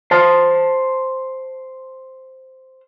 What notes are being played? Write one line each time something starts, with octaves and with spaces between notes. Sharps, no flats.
C5 A5